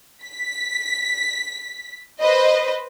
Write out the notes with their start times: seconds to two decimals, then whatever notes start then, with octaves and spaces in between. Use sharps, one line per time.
0.24 B6
2.21 B4 C5 D#5